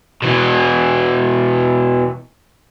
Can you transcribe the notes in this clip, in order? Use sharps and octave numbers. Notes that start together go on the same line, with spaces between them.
B2 E3